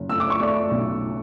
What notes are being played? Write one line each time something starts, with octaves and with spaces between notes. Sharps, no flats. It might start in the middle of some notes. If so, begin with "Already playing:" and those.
Already playing: F#1
A3 E6
D6
C#6
A3 D5 D6
B1